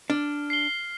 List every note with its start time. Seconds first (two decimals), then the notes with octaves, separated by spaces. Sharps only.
0.10 D4 F6
0.50 C7 G7